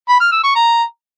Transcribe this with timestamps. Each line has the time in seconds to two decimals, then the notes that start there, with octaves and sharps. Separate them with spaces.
0.09 B5
0.20 F6
0.32 E6
0.44 C#6
0.55 A#5